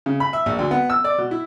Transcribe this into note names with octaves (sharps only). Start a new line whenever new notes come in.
C#3
B5
E5
A#1
D2
B3
E6
D5
B2
E4